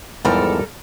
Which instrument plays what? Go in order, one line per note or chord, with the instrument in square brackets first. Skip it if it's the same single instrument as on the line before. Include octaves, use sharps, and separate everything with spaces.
[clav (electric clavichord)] E2 G#2 F3 [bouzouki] G3 A4 A#4